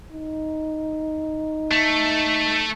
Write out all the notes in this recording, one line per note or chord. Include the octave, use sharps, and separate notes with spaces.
D#4
A3